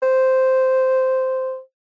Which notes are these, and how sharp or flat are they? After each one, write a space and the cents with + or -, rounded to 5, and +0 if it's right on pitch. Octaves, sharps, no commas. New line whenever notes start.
C5 -5